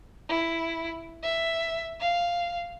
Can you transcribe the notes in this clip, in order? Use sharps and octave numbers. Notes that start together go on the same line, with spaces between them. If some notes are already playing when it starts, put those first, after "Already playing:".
E4
E5
F5